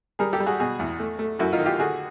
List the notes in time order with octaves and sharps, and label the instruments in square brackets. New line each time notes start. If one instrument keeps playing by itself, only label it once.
[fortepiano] G3 G#4 A#4
G4 A4
G3
F#4 G#4
B2 F#4 G#4
E2
A3
A3
F#2 E4 F#4
D#4 F4
D#3
F4 G4
D3 F#4 G#4